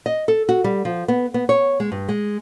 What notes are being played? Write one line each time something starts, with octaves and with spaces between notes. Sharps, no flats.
D#5
A4
F#4
G3
F3
B3
B3
C#5
G#3
G2
G#3